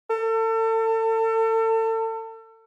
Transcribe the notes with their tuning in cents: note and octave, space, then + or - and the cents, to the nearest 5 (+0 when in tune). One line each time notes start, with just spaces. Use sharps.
A4 +35